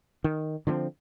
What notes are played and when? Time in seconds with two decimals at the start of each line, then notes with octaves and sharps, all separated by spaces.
0.24 D#3
0.67 D3 F3 A3 C4